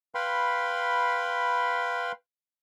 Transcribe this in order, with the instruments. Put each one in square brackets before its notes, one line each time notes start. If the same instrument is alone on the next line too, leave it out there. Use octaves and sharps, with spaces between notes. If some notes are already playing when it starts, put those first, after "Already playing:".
[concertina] B4 F5 G5 B5 C6